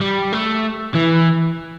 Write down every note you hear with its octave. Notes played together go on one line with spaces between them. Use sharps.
G3
A3
E3